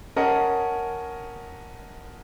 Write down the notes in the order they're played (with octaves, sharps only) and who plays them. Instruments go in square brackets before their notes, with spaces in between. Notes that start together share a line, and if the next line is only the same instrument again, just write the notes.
[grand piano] C#4 A#4 D#5 F#5 A5